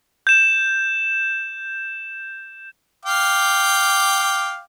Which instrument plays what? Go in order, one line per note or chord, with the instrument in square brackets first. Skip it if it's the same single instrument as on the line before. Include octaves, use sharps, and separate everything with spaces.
[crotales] G6 E7
[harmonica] F5 G5 D6